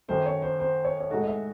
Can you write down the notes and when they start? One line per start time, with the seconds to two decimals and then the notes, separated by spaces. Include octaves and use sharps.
0.08 F#2 D#3 F#3 A3 C5
0.26 C#5
0.42 C5
0.60 C5
0.85 C#5
1.00 C#5
1.10 A2 G#3 D#4 F#4 A4 D#5
1.21 D#5
1.27 E5